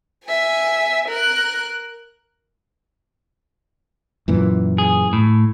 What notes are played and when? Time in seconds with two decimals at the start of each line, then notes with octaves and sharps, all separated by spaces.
0.25 E5 G#5
1.09 A#4 F#6
4.28 F#2 A#2 E3
4.78 G#4
5.13 A2